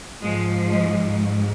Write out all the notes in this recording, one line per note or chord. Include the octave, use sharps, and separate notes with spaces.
G#2 F3 G#3
G#3